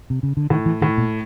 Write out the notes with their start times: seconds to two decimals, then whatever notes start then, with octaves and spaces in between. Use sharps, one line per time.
0.10 C3
0.23 C#3
0.37 D3
0.50 A2 D#3
0.66 E3
0.82 A2 D#3
0.98 A#2